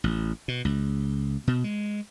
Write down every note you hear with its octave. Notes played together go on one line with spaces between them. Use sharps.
A1
B2
C#2
B2
G#3